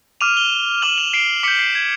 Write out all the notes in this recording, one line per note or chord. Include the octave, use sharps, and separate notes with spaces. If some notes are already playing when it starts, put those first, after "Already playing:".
D6 F6 D#7 F7
F7 G7
D6 F6 E7 F#7
D#7 F7
C7 D7
D6 G6 B6 C#7
C7
G#6